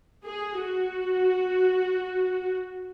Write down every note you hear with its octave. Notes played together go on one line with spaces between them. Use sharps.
G#4
F#4